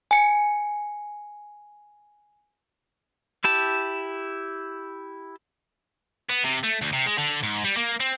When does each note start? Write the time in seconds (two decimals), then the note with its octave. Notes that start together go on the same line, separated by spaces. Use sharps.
0.11 G#5 C#7
3.44 E4 G4 A5
6.30 B3
6.44 C3
6.64 A3
6.82 D2
6.93 C3
7.06 G#3
7.18 D3
7.43 G#2
7.64 G3
7.77 A#3
8.00 C4